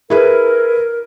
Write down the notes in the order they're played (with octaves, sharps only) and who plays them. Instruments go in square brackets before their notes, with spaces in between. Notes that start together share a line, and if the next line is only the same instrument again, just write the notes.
[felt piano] E4 G#4 B4 [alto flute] A#4